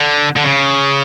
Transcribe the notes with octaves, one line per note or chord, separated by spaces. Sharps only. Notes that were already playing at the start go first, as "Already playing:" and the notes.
Already playing: D3
D3
C#3